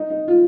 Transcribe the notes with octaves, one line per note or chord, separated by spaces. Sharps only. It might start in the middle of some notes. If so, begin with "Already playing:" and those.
Already playing: D#4
D#4
F4